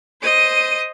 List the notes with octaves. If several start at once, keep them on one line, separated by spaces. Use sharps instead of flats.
C5 D#5 D#7